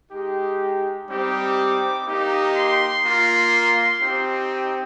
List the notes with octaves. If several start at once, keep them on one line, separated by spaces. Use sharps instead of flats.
G#3 D#4 G4
G3 C4 D#4 G4 D6
A#3 D#4 G4
C6
A#3 F4
C4 D#4 G4